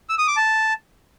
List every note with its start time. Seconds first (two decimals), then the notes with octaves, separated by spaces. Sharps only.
0.09 E6
0.18 D#6
0.27 D6
0.37 A5